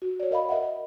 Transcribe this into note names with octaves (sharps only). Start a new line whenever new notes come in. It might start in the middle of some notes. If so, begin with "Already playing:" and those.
F#4
C#5 D5
A#4 D#5 F5 B5
A#4 D#5 E5 F#5
D#5